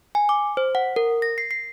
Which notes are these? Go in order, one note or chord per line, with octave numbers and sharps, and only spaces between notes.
G#5
D6
C5
F#5
A#4
A#6
C7
C7